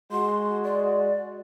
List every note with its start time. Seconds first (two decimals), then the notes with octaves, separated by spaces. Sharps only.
0.12 G#3 F#4 C6
0.64 D5